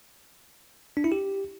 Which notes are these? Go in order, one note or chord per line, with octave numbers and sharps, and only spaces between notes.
D4
E4
G4